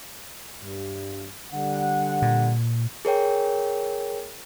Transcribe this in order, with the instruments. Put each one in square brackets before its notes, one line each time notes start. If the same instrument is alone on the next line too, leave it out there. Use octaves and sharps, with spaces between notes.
[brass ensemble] G2
D3 G3 F#5
[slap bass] A#2
[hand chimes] G#4 A#4 C#5 G5